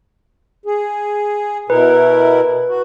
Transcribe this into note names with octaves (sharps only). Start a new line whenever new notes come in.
G#4
B2 E4 A#4 B4
F#4